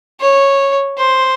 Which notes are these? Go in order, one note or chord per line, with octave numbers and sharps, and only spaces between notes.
C#5
C5